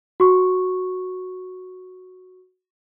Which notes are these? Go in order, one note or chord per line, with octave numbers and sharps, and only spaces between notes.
F#4 C#6